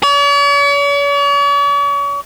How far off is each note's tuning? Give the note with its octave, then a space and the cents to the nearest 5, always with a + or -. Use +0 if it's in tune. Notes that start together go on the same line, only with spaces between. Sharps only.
C#5 +45